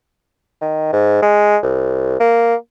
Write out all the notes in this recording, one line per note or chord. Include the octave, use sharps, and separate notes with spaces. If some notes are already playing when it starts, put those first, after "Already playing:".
D#3
G#2
G#3
C2
A#3